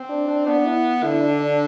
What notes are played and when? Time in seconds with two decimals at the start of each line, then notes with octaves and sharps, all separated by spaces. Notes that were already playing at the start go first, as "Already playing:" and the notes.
Already playing: C4
0.09 D4
0.28 D4
0.47 B3 D4
0.65 E4
1.03 D3 E4
1.21 D4
1.40 D4